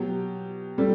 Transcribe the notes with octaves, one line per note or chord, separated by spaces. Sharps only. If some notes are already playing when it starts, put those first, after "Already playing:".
Already playing: B2 F#3 G4
C3 G3 A4